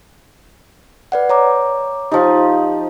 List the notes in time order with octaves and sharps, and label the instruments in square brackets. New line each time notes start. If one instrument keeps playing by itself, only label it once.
[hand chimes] B4 D5 F#5
C#5 A#5 D6
[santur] F3 D#4 [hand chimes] G4 A5